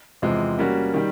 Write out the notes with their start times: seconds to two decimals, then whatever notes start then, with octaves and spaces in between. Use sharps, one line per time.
0.22 E2 C3 F3 G#3 C4
0.59 G3 A#3 C#4 F#4
0.94 D#3 G3